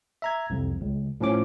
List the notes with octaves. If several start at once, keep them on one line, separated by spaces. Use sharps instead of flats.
E5 A#5 G#6
C2 F2
C#2
A2 F3 C#4 D6